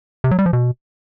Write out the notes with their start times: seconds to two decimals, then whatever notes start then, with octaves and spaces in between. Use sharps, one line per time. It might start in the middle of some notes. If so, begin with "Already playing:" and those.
0.24 C3
0.31 F#3
0.39 G3
0.46 F3
0.53 B2